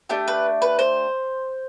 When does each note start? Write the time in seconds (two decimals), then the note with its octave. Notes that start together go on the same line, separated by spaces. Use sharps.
0.09 A3 D4 G4
0.28 B4
0.62 B4
0.79 C5